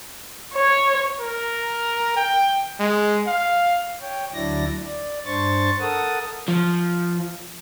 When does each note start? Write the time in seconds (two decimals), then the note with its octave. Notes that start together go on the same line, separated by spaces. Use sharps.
0.54 C#5
1.20 A#4
2.17 G5
2.79 G#3
3.27 F5
4.02 C#5 G5
4.34 D2 F#3 D4 E4 D5 A#6
4.85 D5
5.26 G2 D4 C5 C#6 A6
5.80 A4 A#4 F#5 A5 D#6
6.48 F3